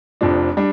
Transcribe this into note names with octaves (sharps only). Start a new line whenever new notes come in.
F1 F2 F3 D4
G3 D4